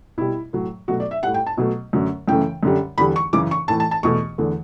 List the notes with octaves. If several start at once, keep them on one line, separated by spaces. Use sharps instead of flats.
B2 G3 E4
A2 F#3 A3
B2 F#3 A3 F#4
D5
E5
A2 G3 F#5
G5
A5
B2 F#3 A3
F#2 D3 F#3 A3
F#2 C#3 E3 A3 G5
F#2 D3 G3
E2 D3 G3 B5
C#6
F#2 C#3 E3 D6
C#6
A2 E3 A3 A5
A5
A5
E2 B2 A3 C#6
E2 D3 A3